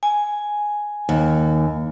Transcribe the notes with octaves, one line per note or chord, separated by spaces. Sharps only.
G#5
D#2